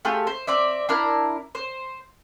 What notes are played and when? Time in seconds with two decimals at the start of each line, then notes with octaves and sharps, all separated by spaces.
0.05 A3 F4 G4 G#4
0.27 C5
0.47 C4 D5 E5
0.89 D4 E4 A#4
1.55 C5